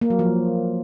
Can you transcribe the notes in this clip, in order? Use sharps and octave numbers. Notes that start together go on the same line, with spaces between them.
A#3
F#3
F3